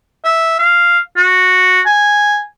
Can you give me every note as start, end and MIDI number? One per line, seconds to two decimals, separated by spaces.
0.25 0.57 76
0.59 0.99 77
1.17 1.81 66
1.86 2.41 80